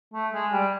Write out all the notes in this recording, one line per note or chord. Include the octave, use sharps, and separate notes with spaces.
A3
G#3
G3